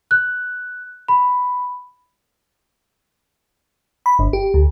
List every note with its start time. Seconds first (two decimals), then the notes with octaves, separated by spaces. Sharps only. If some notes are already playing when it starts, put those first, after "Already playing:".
0.11 F#6
1.08 B5
4.06 B5
4.19 G1
4.33 G4
4.54 D2